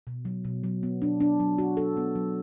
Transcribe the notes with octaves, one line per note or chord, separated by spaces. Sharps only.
B2
F#3
B2
F#3
B3
D4
D4
F#3
F#4
A4
B3
F#3